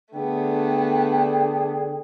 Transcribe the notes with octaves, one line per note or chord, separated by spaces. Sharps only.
D3 A3 B3 D4 G#4 G5